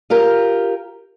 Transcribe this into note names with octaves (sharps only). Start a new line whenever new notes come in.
F4 G4 A#4